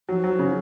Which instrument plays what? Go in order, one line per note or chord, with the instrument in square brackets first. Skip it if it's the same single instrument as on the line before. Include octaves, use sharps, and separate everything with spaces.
[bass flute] F3 [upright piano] F#3
[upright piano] F#3
C#3